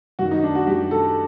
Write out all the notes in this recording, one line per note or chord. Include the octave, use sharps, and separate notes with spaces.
F#2 D#3 F#4
D#4
D4
F#4
F#2 D#3 G4
A4